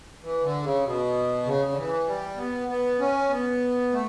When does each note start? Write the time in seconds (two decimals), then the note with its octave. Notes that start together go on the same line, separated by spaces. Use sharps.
0.22 E3
0.43 D3
0.63 C#3
0.84 B2
1.45 C#3
1.71 D3
1.77 E3
2.06 G3
2.37 B3
2.68 B3
3.00 C#4
3.30 B3
3.92 A3